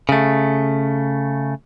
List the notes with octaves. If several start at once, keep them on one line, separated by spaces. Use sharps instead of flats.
C#3 A3